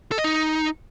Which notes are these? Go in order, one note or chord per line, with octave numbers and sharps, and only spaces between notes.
A4
D#5
D#4